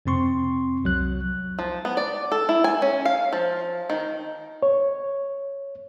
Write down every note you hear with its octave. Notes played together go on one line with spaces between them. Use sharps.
F2 C3 C4 C6 C#6
C2 F#3 F#6
F3
B3
D5
A4
E4
G#5
C#4
F5
F3
D#3
C#5